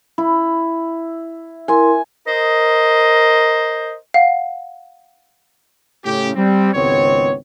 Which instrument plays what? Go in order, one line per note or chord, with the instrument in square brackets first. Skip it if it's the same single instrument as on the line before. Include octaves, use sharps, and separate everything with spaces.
[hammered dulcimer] E4
[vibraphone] E4 A#4 C6 [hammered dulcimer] G#5
[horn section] A#4 C5 D#5
[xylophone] F5 F#5
[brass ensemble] A2 C#3 C#4 G4
G3 C4
G#1 C#2 B3 C4 C#5